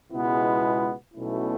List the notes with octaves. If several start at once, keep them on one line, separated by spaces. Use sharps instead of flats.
C#2 B2 G#3 B3 E4
B1 B2 A3 C#4 E4